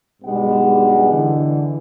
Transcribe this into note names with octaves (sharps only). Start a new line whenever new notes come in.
B1 G2 G3 G#3 B3 F#5
D3 E3